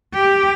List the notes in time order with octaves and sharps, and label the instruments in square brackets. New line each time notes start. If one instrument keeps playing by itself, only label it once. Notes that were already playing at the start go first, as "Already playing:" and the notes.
[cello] G4